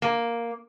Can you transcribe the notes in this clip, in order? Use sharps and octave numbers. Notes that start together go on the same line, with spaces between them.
A#3